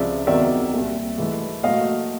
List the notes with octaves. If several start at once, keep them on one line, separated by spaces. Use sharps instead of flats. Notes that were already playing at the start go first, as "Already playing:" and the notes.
Already playing: C#2 C3 F3 G#3 D5 E5
E2 C3 D#3 F#3 D5 E5
C2 A#2 G3
G#2 E3 A3
A#2 F#3 A3 D#5 F5